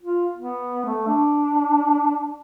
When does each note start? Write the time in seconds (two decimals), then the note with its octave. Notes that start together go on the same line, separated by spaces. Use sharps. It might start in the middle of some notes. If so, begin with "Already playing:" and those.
0.02 F4
0.38 B3
0.86 A3
1.07 D4